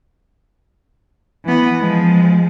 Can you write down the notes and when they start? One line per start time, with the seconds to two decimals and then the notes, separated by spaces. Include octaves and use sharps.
1.45 E3 B3
1.80 F3 G#3